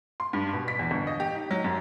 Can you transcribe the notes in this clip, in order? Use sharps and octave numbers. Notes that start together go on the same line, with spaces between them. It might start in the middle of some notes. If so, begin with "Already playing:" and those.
C6
G2
B2
B6
E2
G1
D#5
G4
D#4
F#3
F#2